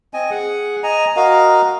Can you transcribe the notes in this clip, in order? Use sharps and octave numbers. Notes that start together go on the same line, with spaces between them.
C4 D#5 G#5
G#4 F#5
D#5 G#5 A#5
F#4 A#4 D#5 F5